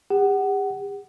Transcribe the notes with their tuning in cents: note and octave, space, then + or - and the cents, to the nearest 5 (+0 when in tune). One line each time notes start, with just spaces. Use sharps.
G4 +45 F#5 +20